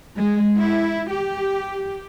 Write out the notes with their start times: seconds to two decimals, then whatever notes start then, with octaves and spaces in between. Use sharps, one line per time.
0.16 G#3
0.58 E4
1.11 G4